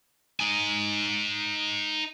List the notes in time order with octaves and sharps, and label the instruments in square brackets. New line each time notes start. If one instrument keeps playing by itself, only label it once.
[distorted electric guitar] D#4 G#5